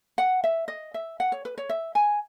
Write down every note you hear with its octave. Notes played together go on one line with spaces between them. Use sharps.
F#5
E5
D#5
E5
F#5
C#5
B4
C#5
E5
G#5